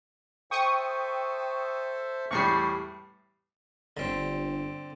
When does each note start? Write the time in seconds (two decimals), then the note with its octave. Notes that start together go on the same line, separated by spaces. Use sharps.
0.51 A4 C5 E5 G5 C#6 D#6
2.31 E2 A2 G3 C#6 C7
3.97 G1 D3 C4